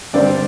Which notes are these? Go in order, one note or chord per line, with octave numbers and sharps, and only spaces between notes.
G2 D3 C4 D5